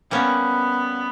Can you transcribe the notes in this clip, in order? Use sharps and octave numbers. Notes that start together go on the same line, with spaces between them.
G3 A#3 B3 C#4